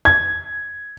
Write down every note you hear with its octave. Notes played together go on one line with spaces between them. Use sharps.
G#6